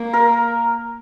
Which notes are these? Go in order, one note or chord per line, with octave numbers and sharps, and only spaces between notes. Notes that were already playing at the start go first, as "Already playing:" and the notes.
Already playing: A#3
A#4